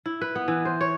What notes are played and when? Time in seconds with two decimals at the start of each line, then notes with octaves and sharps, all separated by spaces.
0.06 E4
0.21 B4
0.35 B3
0.48 E3
0.65 C5
0.81 C#5